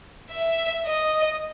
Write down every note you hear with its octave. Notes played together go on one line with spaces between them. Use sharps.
E5
D#5